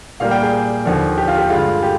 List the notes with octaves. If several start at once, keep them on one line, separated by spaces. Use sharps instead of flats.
A#2 G3 A#3 F5
G5
G#4
D#2 D3 F3
G4
F4
G4
G2 D3 G#3 F4
G4